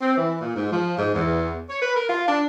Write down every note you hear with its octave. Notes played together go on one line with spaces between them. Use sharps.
C4
E3
A#2
G#2
F3
G#2
E2
C#5
B4
A#4
F4
D4